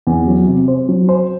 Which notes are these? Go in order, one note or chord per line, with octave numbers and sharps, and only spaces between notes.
E2
F#3
C3
C5
F#3
C5